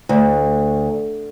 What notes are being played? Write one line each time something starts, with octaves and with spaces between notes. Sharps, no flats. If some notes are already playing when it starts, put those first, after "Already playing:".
D2